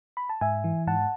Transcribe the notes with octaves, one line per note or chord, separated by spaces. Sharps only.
B5
A5
G#2 E5 G#5
E3
G#2 F#5 A5